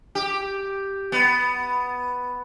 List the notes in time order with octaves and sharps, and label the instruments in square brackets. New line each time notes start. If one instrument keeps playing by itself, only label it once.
[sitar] G4
B3